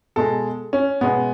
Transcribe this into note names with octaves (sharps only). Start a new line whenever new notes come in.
B2 G#3 A4
C#4
B2 G#3 B3